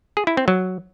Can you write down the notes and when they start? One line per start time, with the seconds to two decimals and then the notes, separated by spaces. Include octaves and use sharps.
0.17 G#4
0.27 E4
0.37 C4
0.48 F#3